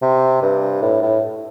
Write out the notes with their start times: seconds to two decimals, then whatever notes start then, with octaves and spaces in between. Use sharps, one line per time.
0.02 C3
0.42 G2
0.82 A2
1.02 A2